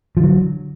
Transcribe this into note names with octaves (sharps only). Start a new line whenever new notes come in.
D3 F3 F#3